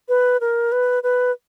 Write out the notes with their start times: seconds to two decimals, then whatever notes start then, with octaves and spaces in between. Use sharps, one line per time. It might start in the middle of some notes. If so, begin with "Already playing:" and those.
0.09 B4
0.41 A#4
0.72 B4
1.03 B4